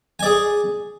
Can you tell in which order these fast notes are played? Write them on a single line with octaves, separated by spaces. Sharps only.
G#5 D5 G#4